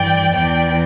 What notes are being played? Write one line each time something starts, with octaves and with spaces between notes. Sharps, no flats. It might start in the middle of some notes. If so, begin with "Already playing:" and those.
Already playing: G2 E3 D5 G5
E2 E3 D5 G5